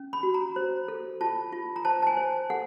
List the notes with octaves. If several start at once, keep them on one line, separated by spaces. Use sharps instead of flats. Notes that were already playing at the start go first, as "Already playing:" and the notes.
Already playing: C#4
B5
F#4
A#5
C5
A4
F4 A5
F4
A#5
C5 A5
A5
G#5
C5
A4 F#5